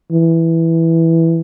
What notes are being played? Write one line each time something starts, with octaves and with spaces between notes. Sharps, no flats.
E3